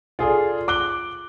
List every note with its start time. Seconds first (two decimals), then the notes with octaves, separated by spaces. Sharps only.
0.19 F4 G#4 A4 D5
0.68 D6 F#6 G7